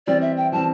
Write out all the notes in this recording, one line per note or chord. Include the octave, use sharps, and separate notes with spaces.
E3 G3 C4 D5
E5
G5
E3 G3 C4 A5